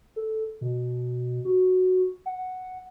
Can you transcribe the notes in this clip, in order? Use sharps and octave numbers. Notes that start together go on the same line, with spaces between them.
A4
B2
F#4
F#5